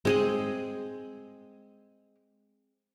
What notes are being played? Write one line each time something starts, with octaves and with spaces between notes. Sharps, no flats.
G#3 C4 G#4 D#5